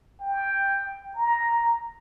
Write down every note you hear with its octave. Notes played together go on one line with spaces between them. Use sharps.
G5
A#5